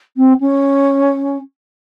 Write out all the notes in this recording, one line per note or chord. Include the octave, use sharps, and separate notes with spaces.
C4
C#4